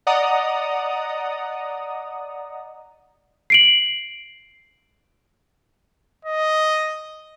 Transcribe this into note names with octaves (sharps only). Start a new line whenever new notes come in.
D5 D#5 F#5 A#5 D#6
C7 D7 F#7
D#5